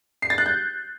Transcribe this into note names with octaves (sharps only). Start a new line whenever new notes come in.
C7
A6
F#6
G6